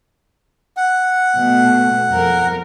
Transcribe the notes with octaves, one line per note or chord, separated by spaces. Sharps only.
F#5
B2 A3
F2 A#4